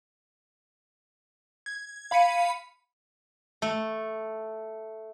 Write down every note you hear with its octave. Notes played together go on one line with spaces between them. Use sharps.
G#6
F5 B5 B6 C#7 D#7
A3